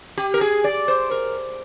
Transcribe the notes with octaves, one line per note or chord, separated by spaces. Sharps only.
G4
A#4
G#4
D5
C5
A#4